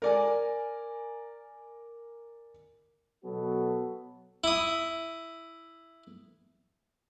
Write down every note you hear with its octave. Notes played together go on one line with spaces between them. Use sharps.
A#4 D5 G#5
B2 F#3 B3 F#4 A4
E4 D#6